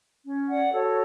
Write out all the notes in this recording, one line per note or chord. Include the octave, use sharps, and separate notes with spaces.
C#4
D5 F#5
F#4 A4 C#5